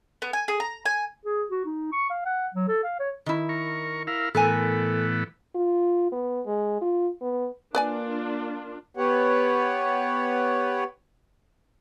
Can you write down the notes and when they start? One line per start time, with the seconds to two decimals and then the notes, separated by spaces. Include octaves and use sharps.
0.22 B3
0.33 G#5
0.48 G#4
0.60 A#5
0.86 G#5
1.25 G#4
1.51 F#4
1.65 D#4
1.92 C#6
2.10 F5
2.25 F#5
2.54 F#3
2.68 A4
2.84 F5
2.99 C#5
3.26 D#3 E4
3.49 A#4 C#6
4.07 E4 A#4 F5
4.35 A2 E3 B3 A4 A#4 G#5
5.55 F4
6.12 B3
6.46 G#3
6.81 F4
7.21 B3
7.75 A#3 D4 F4 B4 D5 G#5
8.97 B3 G4 B4 C#5 F#5